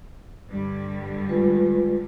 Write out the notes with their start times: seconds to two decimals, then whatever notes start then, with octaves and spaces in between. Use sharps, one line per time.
0.49 G2 D3 G3
1.29 G#3 F4 B4